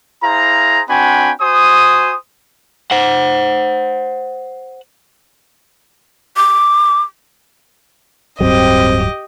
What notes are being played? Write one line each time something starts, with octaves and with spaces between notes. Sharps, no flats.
E4 G#4 C5 F5 A#5
C4 D4 F#4 G5 G#5 B5
F#4 C5 G#5 D#6
C5 F#5
D6
D1 G2 F#3 C4 G4 D#5